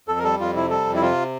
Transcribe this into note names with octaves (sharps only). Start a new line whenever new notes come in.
F2 A4
A#4
G3 A4
F2 F4
C3 E4
G3 A4
F2
E4
C3 F4